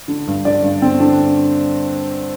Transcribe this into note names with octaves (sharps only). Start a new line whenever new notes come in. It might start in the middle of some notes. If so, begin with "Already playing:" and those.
D3
G2
D3 D5
G2
D3 C4
D3 D4